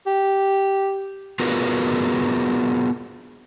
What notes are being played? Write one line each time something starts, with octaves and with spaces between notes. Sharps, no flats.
G4
B3 F4 F#4 G#4 A#4 B4